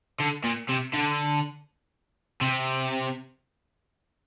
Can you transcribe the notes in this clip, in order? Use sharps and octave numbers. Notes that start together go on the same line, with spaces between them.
D3
A#2
C3
D3
C3